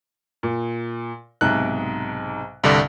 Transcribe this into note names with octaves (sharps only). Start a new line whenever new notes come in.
A#2
B1 G#2 C3 F#6
C2 G2 D3 D5